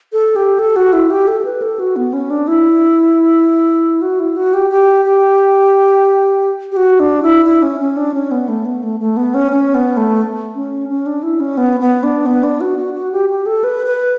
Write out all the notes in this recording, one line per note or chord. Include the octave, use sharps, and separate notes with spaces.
A4
G4
A4
F#4
E4
G4
A4
B4
A4
F#4
B3
C#4
D4
E4
F#4
E4
F#4
G4
G4
G4
G4
F#4
D4
E4
E4
C#4
C#4
D4
C#4
B3
A3
B3
A3
A3
B3
C#4
C#4
B3
A3
C#4
C#4
D4
E4
C#4
B3
B3
D4
B3
D4
F#4
F#4
F#4
G4
G4
A4
B4
B4